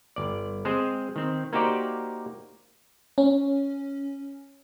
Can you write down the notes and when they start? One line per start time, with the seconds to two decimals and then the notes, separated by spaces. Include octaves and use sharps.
0.16 G1 D5
0.65 G#3 C4 G#4 C5
1.16 D#3 C4
1.53 A#3 D#4 F#4 G4 C5 D5
3.18 C#4